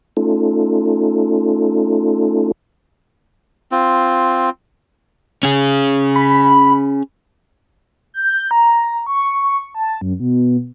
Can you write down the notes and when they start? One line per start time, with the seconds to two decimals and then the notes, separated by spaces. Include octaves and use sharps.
0.17 A3 C#4 D#4 F4 A4
3.72 C4 F4
5.43 C#4 G#4
6.16 B5
8.14 G6
8.51 A#5
9.07 C#6
9.75 A5
10.01 F#2
10.20 B2